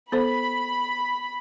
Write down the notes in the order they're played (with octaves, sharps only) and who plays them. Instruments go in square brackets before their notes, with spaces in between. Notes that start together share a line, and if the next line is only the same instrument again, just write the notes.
[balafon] B3 A4 C5 [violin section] B5